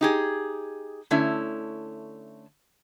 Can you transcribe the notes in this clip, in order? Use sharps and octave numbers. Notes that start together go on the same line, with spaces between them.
D#4 G4 G#4
D3 A3 C#4 E4